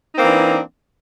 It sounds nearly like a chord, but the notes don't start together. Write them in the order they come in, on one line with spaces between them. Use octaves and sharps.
D#4 C4 A#3 E3 D4